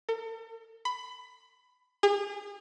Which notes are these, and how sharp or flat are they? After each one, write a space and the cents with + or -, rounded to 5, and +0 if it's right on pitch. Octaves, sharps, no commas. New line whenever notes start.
A4 +45
B5 +20
G#4 -40